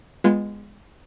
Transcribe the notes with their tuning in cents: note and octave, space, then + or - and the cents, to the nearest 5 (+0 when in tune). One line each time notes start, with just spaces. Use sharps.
G#3 -15 B3 +0 F4 +0